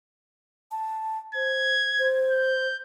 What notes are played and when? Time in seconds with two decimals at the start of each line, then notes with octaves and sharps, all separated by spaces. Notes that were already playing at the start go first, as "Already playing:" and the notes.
0.71 A5
1.35 C5 G#6
1.99 C5
2.31 G6